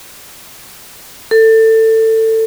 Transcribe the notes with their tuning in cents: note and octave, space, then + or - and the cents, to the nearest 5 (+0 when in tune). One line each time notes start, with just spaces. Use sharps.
A4 +20